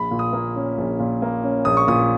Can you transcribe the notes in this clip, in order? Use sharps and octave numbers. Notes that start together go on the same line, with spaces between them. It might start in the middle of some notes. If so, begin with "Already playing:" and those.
Already playing: A#1 B5
A#2
D#6
A#3
C#4
A#1
A#2
A#3
C#4
A#1 D#6
C#6
A#2 D#6